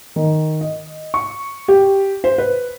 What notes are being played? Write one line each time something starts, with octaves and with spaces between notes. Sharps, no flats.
D#3
D#5
C#6
G4
C5
B4